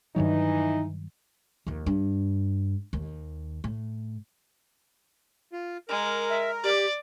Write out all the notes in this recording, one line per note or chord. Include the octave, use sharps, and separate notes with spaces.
G2 D#3 E3 F#3 D#4
D#2 F3
G2
D#2
A2
F4
G#3 A#4
E5
G4 D5